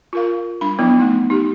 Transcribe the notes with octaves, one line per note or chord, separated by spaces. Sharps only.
F4 A#4 F5
G3 D4 B5
F3 F#3 B3 E4
A3 D#4
D#4 G4